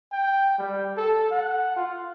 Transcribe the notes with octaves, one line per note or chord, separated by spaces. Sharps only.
G5
G3
A4
F#5
F4